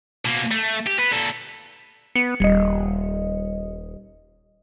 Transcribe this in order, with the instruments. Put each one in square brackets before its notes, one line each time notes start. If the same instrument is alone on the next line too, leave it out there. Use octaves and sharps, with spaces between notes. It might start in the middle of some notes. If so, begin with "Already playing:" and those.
[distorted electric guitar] B2 A#3
A3
G4
B3 B4
A#2 A4
[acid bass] B3 [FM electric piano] C#7
[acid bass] D#1 [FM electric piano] G3 D#5